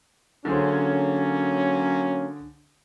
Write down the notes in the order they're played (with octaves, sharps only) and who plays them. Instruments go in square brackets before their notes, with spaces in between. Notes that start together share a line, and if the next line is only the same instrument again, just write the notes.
[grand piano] D3 G#4 C5 [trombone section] F#3 A#3 C#4